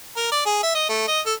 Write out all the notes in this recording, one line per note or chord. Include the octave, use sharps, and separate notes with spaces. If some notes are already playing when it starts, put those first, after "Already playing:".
A#4
D5
G#4
E5
D#5
A3
D#5
A4